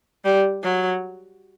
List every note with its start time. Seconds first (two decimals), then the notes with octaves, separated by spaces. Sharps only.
0.25 G3
0.63 F#3